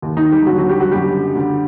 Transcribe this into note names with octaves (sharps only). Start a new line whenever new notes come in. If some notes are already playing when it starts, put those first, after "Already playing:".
D#2 D#3
D#3 D#4
G3 G4
D#2 D3 F#3 F#4
F#3 F#4
G3 G4
F#3 F#4
F#1 F#2 D3 G3 G4
D2 D3